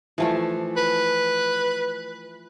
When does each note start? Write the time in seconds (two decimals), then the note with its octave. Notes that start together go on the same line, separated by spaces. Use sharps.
0.18 E3 F3 A3
0.77 B4